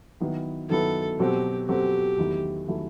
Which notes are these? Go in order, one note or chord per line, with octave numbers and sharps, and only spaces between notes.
D#3 F#3 B3 E4
D#3 F#3 B3 E4 A4
B2 F#3 C4 F#4 G4 A4
B2 F#3 C4 F#4 G4 A4
E2 D#3 F#3 A3 E4
D#3 F#3 A3 E4